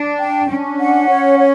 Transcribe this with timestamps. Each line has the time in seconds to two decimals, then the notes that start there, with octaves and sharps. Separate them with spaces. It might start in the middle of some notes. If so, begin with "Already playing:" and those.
Already playing: D4
0.20 G5
0.50 C#4 D4
0.80 F#5
1.09 C#5
1.39 C#5